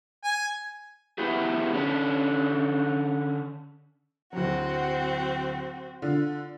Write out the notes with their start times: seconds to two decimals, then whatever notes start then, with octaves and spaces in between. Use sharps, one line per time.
0.24 G#5
1.18 B3 E4 G4 G#4
1.73 D3 C#4 D4
4.33 D1 F#3 C4 F#4
6.02 D3 F4